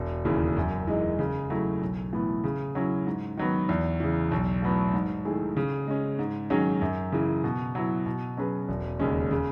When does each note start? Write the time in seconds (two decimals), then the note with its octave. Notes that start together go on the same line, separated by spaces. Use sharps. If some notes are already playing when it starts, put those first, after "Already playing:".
Already playing: E1
0.25 D#2 C#3 E3
0.57 F#2
0.87 E3 G#3 D#4
1.19 C#3
1.50 F#3 A3 E4
1.81 B1
2.13 A2 E3 B3
2.44 C#3
2.75 F#3 C#4 E4
3.07 G#2
3.37 D#3 F#3 B3
3.69 E2
4.00 C#3 E3
4.31 B1
4.62 A2 F#3 B3
4.94 G#2
5.25 D#3 A3 E4 G#4
5.57 C#3
5.88 G#3 C#4
6.19 G#2
6.50 D#3 F#3 C#4 G#4
6.81 F#2
7.12 C#3 E3
7.44 B2
7.75 F#3 B3 E4
8.06 B2
8.37 F#3 C#4 G#4 B4
8.69 E1
9.00 D#2 C#3 G#3 C#4
9.31 C#3